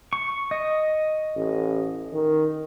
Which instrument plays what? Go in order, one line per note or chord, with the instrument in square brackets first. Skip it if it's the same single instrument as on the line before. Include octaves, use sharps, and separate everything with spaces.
[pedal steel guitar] C#6
D#5
[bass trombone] A1
D#3